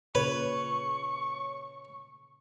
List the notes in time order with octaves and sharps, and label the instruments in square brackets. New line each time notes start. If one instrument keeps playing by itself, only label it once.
[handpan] A#2 C#3 [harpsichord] B4 [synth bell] C#5 [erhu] C#6